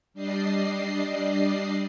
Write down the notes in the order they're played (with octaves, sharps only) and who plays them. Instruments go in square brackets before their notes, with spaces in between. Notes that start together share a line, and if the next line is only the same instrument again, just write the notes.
[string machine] G3 D4 D5 D#5 C7